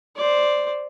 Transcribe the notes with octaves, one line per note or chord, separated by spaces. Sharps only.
C5 D5